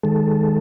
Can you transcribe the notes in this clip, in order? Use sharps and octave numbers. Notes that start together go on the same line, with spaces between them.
D#3 G#3 A4